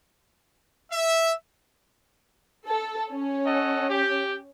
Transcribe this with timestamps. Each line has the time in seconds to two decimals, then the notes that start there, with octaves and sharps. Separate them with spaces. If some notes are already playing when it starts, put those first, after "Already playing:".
0.91 E5
2.67 A4
3.11 C#4
3.45 A4 D#5 F#5
3.88 G4